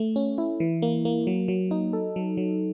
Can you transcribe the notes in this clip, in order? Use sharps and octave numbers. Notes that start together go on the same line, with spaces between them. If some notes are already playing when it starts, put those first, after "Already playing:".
Already playing: A3
C#4
E4
E3
A#3
A#3
F#3
F#3
D#4
A4
F#3
F#3